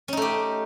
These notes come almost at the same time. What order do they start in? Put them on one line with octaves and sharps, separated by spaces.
C#4 D#4 A3 G4